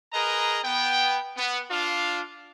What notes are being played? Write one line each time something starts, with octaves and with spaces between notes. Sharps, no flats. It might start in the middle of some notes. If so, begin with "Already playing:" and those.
G#4 A#4 B4 D#5 A#5
B3 G5
B3
D4 F4 F5